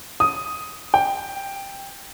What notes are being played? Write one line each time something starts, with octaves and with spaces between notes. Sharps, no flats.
D#6
G5